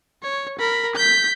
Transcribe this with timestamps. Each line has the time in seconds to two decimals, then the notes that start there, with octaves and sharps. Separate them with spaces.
0.22 C#5
0.59 A#4 B5
0.95 G6 B6